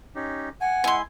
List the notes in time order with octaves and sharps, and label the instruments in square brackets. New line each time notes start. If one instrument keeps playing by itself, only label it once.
[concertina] C#4 D#4 G4
[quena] F#5 [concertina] G#5
[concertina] G#3 E4 [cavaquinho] G#5 C6